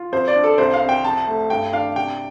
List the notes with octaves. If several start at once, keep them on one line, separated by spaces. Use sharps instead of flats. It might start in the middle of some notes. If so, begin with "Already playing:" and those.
Already playing: F4
F2 C5
D5
D4
A4
C2 C5
F5
C4
G5
F2 A5
A3
G2 G5
D4 F5
C3 G5